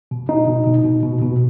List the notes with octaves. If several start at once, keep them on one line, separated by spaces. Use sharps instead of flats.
B2
B2 D#4
B2
B2
B2
B2
B2